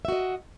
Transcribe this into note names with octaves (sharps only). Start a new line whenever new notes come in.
F#4 D#5 E5